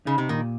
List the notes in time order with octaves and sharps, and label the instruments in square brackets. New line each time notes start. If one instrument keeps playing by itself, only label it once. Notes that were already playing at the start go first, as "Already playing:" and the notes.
[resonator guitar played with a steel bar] C#3 [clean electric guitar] D#4
[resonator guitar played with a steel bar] C3
[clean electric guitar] A#2 [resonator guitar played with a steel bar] D#3